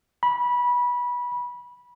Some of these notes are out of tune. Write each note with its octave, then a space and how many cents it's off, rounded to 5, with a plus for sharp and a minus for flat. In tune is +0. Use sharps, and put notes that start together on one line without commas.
B5 -20